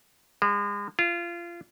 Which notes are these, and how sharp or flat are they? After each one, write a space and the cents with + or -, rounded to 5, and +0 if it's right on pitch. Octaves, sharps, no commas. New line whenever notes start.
G#3 -35
F4 -25